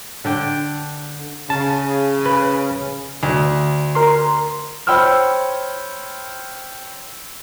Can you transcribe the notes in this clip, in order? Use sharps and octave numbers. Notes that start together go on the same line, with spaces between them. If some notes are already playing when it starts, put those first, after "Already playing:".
D3 D4 G5
C#3 A5
B4
D2
A#4 C6
C5 C#5 G5 B5 E6 F6